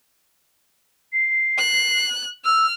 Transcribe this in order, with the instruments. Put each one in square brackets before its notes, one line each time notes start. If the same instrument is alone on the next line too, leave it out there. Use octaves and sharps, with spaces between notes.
[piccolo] C7
[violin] F#6
[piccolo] E6 [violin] F6